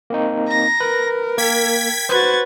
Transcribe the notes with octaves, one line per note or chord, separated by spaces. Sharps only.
A#3 C4 D#4
A#5 A#6
A#4 B4
A#3 G5 G#6 B6
F#4 B4 C5 G#6 A6